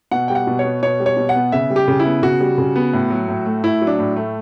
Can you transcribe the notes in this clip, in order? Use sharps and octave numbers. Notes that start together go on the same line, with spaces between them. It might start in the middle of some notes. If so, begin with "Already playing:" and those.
B2 F#5
G3 G5
F#5
B2
C#5
B3
B2 C#5
G3
C#5
B2
F#5
B3
C#3 E5
G3
G4
C#3
E4
B3
C#3 F#4
G3
C#3
B3
A2
F#3
A2
A3
A2 E4
F#3
D4
A2
A3